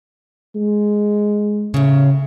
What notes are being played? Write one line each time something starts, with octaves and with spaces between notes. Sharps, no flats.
G#3
A2 C#3